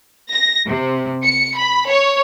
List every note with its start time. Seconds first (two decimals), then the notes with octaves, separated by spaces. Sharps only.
0.30 A#6
0.67 C3
1.24 C#7
1.58 B5
1.88 C#5